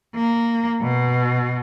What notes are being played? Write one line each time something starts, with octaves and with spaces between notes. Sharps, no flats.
A#3
B2